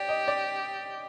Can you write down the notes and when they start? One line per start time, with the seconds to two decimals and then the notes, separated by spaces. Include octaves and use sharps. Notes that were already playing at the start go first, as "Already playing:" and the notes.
Already playing: G4 D5
0.09 D#5
0.28 D5